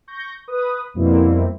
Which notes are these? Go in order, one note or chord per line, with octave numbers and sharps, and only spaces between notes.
C#6 G6 A#6
B4 D#6
F2 B2 G3 A#3 C4 E4